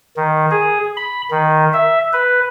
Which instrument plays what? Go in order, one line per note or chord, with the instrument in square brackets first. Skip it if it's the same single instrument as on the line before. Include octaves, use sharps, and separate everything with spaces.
[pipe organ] D#3
G#4
B5
D#3
E5
B4